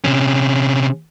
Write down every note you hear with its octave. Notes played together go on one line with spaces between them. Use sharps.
C3 C#4